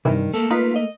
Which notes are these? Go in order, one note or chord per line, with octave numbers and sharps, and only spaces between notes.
B1 G2 C3 D#3 E3
A3 A#3 A4
D#4 F4 B4 B6
D#5